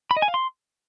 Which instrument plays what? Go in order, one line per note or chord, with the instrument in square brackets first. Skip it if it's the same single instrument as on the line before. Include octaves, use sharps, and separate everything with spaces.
[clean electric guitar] B5
D#5
G#5
F5
C6